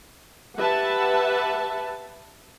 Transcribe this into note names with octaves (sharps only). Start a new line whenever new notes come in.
G4 B4 E5 F#5 A5